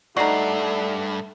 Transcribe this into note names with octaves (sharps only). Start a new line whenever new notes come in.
G2 A3 D#4 F#4 D5 C7